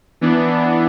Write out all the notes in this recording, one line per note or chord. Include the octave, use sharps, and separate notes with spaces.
E3 B3 D4